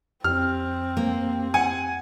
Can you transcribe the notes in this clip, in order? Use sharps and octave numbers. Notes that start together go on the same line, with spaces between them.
F2 C4 G4 F6
A#3
F#5 G#5